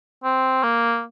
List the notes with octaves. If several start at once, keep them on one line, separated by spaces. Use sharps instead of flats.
C4
A#3